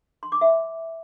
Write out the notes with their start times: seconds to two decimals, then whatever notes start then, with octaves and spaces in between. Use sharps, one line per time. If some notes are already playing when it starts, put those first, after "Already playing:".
0.23 C6
0.32 D6
0.41 E5